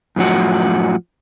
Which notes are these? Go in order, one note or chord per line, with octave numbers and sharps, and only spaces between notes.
F#2 A2 F3 F#4